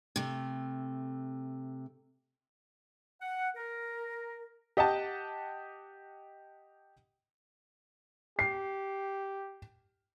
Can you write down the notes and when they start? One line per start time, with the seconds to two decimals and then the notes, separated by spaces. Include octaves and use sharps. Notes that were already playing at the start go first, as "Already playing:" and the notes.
0.16 C3 A3
3.22 F#5
3.56 A#4
4.77 G4 D#5 F#5 G5 A5
8.39 G4 C7